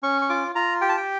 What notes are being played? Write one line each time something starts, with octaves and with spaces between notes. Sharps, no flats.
C#4 C#6
C#6
F4 D6
F4 A#5
G4 G5
A5
G5